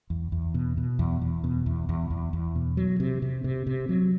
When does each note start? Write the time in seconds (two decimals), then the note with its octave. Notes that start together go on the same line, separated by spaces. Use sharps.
0.10 E2
0.32 E2
0.54 B2
0.77 B2
0.99 E2
1.21 E2
1.44 B2
1.66 E2
1.89 E2
2.10 E2
2.33 E2
2.55 B2
2.77 F#3
3.00 C3
3.22 C3
3.44 C3
3.67 C3
3.89 F#3